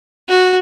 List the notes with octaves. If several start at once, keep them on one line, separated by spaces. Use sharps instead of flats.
F#4